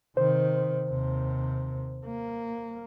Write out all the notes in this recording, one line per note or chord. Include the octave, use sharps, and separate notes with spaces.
C3 D#3 C5
D#2 C3
A#3